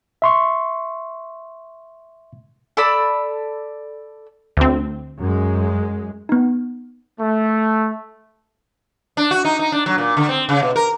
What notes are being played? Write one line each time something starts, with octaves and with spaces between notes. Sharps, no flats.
E5 C6 C#6
A4 D5 B5 E6
D2 C4
F#2 G#3
B3 D#4
A3
D4
F#4
D#4
D#4
D4
F#3
A#2
D3
C4
C#3
B2
A#4